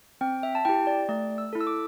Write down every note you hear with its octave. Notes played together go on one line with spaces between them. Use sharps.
C4 G5
E5
A5
E4 G4 G5
D5
A3 D5
E6
E4 A4
E6
D6